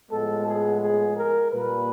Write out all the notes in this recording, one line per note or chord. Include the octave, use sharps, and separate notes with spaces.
A2 F3 G#3 B3 A4
G#4
G#4
A#4
A#2 G3 A#3 B4